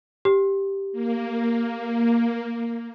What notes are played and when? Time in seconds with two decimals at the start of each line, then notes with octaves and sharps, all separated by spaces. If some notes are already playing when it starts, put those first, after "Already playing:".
0.25 G4
0.92 A#3